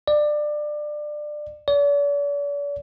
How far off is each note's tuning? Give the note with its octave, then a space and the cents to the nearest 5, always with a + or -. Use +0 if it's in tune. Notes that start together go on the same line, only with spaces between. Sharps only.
D5 +20
D5 -45